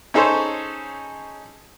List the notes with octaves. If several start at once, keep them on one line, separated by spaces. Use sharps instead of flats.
C#4 D#4 G#4 A4 C5 C#5